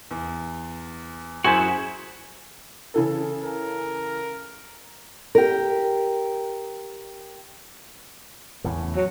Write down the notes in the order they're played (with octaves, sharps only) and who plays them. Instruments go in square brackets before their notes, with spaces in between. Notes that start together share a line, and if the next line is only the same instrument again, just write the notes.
[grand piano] E2
[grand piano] F#2 G#6 [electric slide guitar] E4 F#4 [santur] G#4 C5
[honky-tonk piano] C#3 E3 A4
[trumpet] A#4
[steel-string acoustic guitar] G4 A#4
[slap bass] E2 A2 C#3
[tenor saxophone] F#3